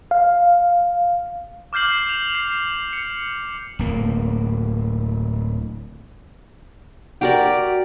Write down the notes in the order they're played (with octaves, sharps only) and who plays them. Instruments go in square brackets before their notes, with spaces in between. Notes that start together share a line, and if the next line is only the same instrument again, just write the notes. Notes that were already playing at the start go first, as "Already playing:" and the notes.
[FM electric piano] F5
[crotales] D6 F6 G6 C7 F#7
F7
C7
C#7
[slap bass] D1 A#3
[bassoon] F#4 [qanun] G4 A#4 D5